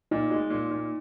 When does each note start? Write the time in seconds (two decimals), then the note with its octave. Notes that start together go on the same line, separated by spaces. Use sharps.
0.11 A#2 D#4
0.30 G#3
0.50 A#2
0.71 A#2